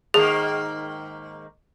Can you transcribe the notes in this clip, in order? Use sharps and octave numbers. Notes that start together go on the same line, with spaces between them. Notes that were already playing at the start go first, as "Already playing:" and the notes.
G#2 D#3 A#3 G#4